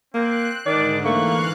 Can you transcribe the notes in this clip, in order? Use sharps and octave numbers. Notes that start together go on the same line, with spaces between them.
A#3 C4 F#6
G#2 D3 D#3 D4 D5
E3 A3 A#3 F5 C#6 F#6